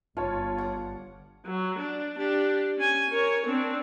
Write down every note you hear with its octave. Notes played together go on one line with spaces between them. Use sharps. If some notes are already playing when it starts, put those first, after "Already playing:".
G1 F4 C#5 A5
F#5 D6
F#3
D4
D4 G4
C#4 G#5
A#4 C#5
C4 D4